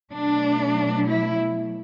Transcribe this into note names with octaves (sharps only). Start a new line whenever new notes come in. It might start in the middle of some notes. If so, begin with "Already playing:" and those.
B2 F#3 A3 D4
E4